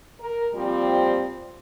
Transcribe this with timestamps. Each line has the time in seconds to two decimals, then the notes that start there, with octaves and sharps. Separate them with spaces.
0.20 A#4
0.54 A#2 F3 G3 C4